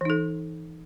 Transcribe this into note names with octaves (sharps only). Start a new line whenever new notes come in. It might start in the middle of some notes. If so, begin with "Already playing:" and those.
E3 D#4 A4